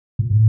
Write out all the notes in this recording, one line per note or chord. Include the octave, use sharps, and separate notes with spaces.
A#2
A2